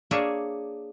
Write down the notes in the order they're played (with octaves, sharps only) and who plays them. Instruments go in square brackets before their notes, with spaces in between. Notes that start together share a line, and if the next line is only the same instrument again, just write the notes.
[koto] A#3 D4 G#4 C#5 E5